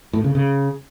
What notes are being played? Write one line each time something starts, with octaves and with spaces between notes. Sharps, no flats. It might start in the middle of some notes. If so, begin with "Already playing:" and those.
A2
C#3
C#3